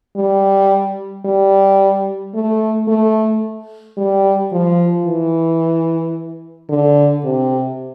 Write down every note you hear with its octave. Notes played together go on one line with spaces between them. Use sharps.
G3
G3
A3
A3
G3
F3
E3
D3
C3